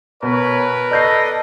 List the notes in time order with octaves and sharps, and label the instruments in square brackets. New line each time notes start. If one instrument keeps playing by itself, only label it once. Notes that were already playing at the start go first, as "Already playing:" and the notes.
[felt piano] B2 [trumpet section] A#4 B4 [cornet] C#5
[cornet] A4 [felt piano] D5 G6 C7 [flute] D#5